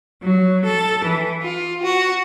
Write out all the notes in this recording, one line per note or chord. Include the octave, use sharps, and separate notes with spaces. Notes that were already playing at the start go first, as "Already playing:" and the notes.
F#3
A4
E3
F4
F#4